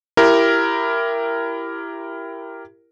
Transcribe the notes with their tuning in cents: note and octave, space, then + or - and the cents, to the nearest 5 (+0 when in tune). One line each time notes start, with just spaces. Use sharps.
E4 +20 G4 +0 A#4 +0